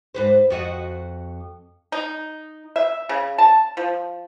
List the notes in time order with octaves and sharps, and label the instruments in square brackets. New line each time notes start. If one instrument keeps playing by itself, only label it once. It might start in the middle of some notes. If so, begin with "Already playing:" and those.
[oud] G#2 B4 C5
F2 F#4 D#5
[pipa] D#4
E5
C#3
A5
F3